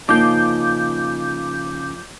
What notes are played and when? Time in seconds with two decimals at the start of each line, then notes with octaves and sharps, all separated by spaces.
0.09 C#3 F3 A#3 D#4 D6 G6